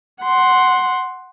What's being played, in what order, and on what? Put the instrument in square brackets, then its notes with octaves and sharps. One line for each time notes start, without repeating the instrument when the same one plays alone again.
[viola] F#5 C6